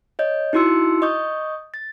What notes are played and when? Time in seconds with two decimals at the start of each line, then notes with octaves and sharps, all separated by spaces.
0.19 C#5 D#5 G6
0.53 D#4 E4 F#4 C6 E6 C#7
1.02 D#5 C#6 D#6 G6
1.74 A6